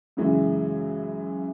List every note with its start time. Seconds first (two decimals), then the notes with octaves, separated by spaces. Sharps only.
0.17 F#2 C#3 E3 G#3